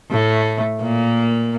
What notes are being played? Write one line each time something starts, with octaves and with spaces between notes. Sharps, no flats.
A2 A3
A#2 A#3